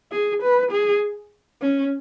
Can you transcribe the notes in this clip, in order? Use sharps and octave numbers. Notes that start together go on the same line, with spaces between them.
G#4
B4
G#4
C#4